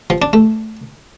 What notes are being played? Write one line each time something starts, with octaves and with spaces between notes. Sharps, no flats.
F3
D4
A3